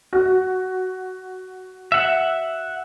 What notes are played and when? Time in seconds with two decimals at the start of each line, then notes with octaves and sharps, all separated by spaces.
0.13 F#4
1.92 E5 F#5